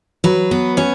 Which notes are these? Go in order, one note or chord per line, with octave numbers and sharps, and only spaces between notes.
F#3 B4
B3
C#4 C#5